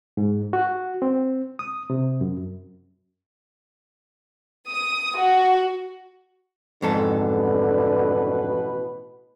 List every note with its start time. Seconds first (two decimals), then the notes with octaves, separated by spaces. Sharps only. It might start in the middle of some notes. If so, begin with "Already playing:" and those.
0.17 G#2
0.53 F#4
1.02 C4
1.59 D#6
1.90 C3
2.21 F#2
4.69 D#6
5.19 F#4
6.82 A1 F2 G#2 B2 D3 A4 B4